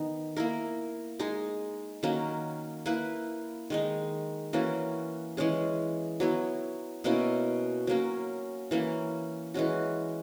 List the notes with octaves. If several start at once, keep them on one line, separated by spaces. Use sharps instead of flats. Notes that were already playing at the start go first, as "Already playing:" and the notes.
Already playing: D#3 B3 D#4
A#3 E4 A#4
G#3 D#4 G#4
D#3 F#3 A#3 C#4
A#3 E4 B4
D#3 G#3 D#4
E3 A#3 C#4 F#4
E3 G#3 C#4 G#4
F#3 B3 E4
B2 A#3 C#4 E4
F#3 A#3 C#4
E3 A#3 C#4
E3 G#3 C#4 F#4